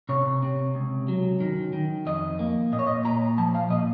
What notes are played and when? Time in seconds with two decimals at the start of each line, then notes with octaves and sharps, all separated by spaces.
0.09 C3 C#5
0.43 C3
0.75 C#2
1.08 F#3
1.41 D#3
1.73 D#3
2.06 F2 D#5
2.39 A#3
2.72 A#2 D#5
2.79 C#5
2.87 D#5
3.05 A#2 A#5
3.38 F3 A5
3.55 F5
3.70 A#2 D#5